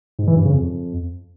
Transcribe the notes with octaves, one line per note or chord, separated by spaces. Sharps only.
G#2
E3
G2
C#3
F2